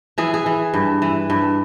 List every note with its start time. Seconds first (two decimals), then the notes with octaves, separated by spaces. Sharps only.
0.18 E3 G#4
0.34 G#4
0.46 E3
0.74 G2
1.02 E3
1.30 G2